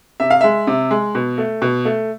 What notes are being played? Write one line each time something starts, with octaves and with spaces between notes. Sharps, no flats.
C3 E5
F5
G#3 E5
C3
G#3
B2
A3
B2
A3